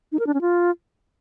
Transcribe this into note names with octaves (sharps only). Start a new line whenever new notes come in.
D#4
A#4
D4
C#4
F4